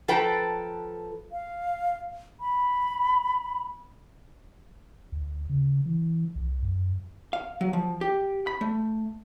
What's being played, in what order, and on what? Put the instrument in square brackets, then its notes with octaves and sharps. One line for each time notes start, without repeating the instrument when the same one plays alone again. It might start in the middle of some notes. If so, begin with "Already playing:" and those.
[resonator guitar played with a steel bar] F3 A4 B4 G5 A#5
[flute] F5
B5
[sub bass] D2
C#3
E3
C2
F#2
[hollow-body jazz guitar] F5
F#3
F3
G4
B5
A3